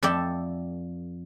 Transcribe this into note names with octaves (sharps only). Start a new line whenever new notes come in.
F2 A4 D5 E5 G5